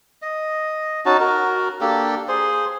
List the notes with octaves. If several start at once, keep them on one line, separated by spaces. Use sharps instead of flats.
D#5
C#4 D#4 F#4 A5
F#4 A#4
A#3 D4 G4 A4
G#4 C5